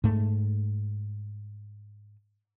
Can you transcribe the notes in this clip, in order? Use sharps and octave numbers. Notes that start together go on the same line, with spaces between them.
G#2 A3